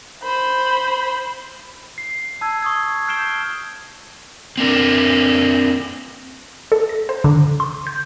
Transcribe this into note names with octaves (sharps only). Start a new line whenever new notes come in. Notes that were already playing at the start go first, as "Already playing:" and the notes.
C5 B5
C7
A5 E6 G#6
C#6 D#6 G#6
F6 G6 C7 D7 E7 G7
C4 D4 A#4
A4
A#6
C5
D3
C6
G6